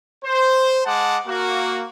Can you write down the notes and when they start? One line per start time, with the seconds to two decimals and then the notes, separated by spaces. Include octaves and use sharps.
0.24 C5
0.85 G#3 F#5 A5 D6
1.27 A#3 F#4